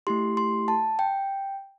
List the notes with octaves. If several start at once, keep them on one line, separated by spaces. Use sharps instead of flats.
A3 E4 G4 C6
C6
A5
G5